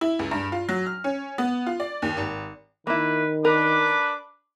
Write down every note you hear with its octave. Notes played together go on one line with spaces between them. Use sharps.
E4
C#2
G2
F4
F#3
F6
C#4
B3
F4
D5
D#2
G#1
D#3 A#3 E4 B4
D4 A#4 B4 D6